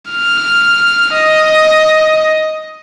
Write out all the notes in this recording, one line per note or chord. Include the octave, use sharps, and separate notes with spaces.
F6
D#5